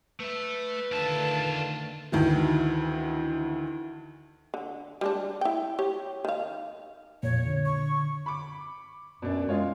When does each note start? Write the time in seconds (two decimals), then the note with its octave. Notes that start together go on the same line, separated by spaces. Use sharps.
0.20 A3 B4 E5
0.92 D3 D#3 A3 F4 E5 A5
2.12 D2 D#3 E3
4.54 D3
5.01 G3 G#3 D4
5.41 E4 G5
5.79 G4 C#5
6.25 D#3 F5
7.23 F2 A#2 C#5
7.46 D3
7.66 C#6
8.26 B5 C#6 D6
9.22 F#2 B2 D4
9.49 G#3 F4 C#5